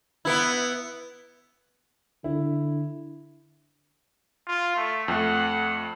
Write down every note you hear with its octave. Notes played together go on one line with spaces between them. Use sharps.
B3 E4
D3 E4
F4
A3
F2 A3 F#5